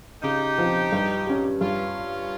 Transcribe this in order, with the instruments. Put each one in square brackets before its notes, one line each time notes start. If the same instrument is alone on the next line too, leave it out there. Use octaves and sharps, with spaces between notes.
[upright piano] C#3 [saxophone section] D#4 G4
[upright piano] F3 C4
G2
G3 C#4
[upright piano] G2 [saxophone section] C#4 F4